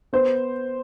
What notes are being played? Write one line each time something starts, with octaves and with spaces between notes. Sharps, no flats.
B3 C5